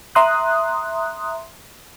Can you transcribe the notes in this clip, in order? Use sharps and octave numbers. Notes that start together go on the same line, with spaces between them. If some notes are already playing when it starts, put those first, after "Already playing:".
E5 A#5 C6 D#6 F#6